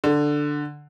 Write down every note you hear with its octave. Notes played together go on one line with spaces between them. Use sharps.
D3